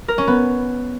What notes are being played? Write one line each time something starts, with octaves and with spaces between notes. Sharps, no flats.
A#4
C#4
B3